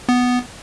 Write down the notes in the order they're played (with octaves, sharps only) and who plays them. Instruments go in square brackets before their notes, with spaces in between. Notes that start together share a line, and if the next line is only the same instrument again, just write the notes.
[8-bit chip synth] B3